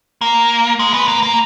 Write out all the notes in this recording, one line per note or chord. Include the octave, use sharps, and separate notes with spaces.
A#3
G#3
B3
A#3
A#3